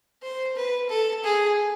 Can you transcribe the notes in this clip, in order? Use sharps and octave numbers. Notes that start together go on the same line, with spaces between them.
C5
B4
A4
G#4